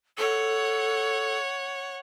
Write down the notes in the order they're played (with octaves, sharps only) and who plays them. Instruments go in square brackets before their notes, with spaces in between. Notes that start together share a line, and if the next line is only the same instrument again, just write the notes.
[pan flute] A4 [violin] C#5 F#5